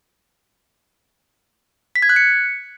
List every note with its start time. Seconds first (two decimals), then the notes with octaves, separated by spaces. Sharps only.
1.96 B6
2.02 G#6
2.09 F#6
2.16 C#7